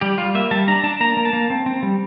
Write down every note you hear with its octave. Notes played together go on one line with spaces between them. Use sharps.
G3 G4
G3 F4
A#3 E5
G3 A5
D4 A#5
D4 A5
A#3 A#5
A#3
A5
A#3
C4
C4
G3